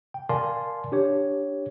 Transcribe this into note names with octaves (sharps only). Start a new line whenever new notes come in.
G5
A#4 D5 F5 G#5 A5 C6
D4 G4 C#5